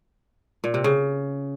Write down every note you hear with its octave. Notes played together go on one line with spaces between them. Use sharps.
A#2
C3
C#3